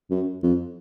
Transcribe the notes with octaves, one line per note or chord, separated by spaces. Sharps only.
F#2
F2